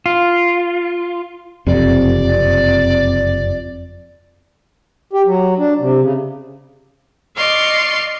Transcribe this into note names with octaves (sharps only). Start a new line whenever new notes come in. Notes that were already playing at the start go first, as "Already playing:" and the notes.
F4
F#1 F2 C3 D5
G4
F#3
D4
C3
C#3
D5 D#5 F5 C6 C#6